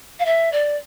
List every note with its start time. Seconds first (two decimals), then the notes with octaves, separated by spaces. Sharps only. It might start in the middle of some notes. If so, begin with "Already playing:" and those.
0.19 F5
0.25 E5
0.52 D5